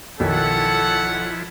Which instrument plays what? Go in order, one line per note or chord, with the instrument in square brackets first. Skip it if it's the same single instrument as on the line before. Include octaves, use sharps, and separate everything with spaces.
[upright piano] B1 D#3 [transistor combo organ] F3 E4 [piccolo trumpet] A4 [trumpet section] C#5 F#5